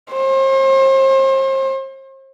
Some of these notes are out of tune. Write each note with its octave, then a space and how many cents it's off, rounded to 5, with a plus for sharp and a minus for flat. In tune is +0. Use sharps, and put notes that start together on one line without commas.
C5 +40